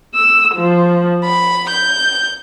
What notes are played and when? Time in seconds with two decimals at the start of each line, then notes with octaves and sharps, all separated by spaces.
0.14 E6
0.55 F3
1.24 B5
1.69 G6